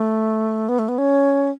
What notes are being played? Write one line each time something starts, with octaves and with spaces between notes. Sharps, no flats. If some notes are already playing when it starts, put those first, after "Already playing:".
Already playing: A3
B3
A3
B3
C#4